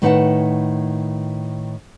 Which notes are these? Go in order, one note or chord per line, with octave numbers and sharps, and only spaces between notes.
A2 D#3 B4 C#5 F#5 A5